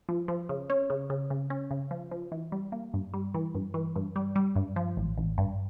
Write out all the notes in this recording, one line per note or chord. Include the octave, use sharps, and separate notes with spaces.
F3
F3
C#3
C#4
C#3
C#3
C#3
C#4
C#3
F3
F3
E3
G3
A#3
G2
G3
E3
G2
E3
G2
G3
G3
G2
F3
A1
A1
G2